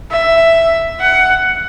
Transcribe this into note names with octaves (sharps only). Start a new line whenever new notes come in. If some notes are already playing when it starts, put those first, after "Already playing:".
E5
F#5